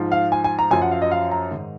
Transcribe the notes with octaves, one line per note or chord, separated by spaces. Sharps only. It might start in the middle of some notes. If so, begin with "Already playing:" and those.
Already playing: G#2 F3
F5
G#5
G#5
A#5
F#2 F3 G#5
F#5
F5
D#5
F5
A#5
G#2 D#3